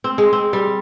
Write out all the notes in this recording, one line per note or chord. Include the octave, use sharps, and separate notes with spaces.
C4
G#3
C4
G3